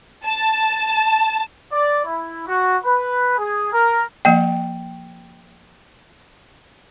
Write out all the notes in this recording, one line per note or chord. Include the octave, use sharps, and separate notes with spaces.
A5
D5
E4
F#4
B4
G#4
A#4
F3 A#3 D#5 G5